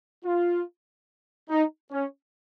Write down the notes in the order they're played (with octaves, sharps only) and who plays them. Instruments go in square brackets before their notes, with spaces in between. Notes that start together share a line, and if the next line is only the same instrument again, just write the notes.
[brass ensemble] F4
D#4
C#4